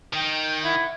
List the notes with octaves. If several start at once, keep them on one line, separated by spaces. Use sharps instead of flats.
D#3 G5
E4 F#5